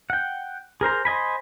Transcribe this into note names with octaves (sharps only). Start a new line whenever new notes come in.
F#5 G5
G#4 A#4 C5 A#5
C5 D#5 G#5 B5